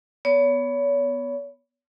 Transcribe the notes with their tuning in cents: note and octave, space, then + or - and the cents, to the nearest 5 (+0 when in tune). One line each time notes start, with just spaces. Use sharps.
B3 +0 C#5 +35